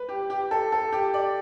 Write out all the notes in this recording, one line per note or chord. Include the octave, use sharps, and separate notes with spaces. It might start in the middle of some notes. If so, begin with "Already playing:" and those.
Already playing: B4
G4
G4
A4
A4
G4
D5